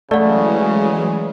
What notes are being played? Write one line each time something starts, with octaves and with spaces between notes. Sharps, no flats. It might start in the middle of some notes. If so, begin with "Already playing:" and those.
C#3 E3 F#3 G#3 A3 D5 F#5